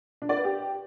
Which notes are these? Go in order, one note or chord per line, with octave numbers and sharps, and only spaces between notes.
D4
D5
B4
G4